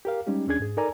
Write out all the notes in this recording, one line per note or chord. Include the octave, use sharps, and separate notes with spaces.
G4 A#4 F5
G3 G#3 C#4 D#4 G4
D#2 C#4 D4 G#4 G#6
G#2 G#4
D#4 A4 A#4 D5 G#5 A#5